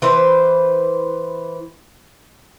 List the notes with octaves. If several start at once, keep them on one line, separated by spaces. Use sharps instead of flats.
E3 B4 C5